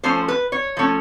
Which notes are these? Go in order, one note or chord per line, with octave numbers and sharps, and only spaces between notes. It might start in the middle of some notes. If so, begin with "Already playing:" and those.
F3 A3 C#4 C5
B4
C#5
F3 A3 C#4